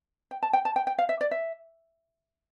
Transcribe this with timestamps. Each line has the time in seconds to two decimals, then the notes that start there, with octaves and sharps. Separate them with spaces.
0.31 G5
0.43 A5
0.53 G5
0.65 A5
0.76 G5
0.87 G5
0.98 F5
1.09 E5
1.21 D5
1.31 E5